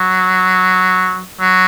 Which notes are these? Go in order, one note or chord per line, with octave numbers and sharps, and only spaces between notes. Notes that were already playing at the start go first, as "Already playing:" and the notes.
Already playing: F#3
F#3